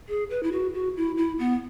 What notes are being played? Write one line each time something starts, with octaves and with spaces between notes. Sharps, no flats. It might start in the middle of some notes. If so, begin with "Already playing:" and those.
G#4
B4
E4
F#4
F#4
E4
E4
B3